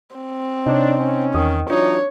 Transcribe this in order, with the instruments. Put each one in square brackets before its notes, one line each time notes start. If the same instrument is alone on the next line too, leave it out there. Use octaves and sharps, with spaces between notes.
[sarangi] C4
[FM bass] C3 [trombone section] D4 [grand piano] D#4 C#5
[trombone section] C#4
[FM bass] E2 [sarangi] D#3 [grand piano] D#6
[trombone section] E3 F#3 D#4 [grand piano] D4 [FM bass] F4 [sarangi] C#5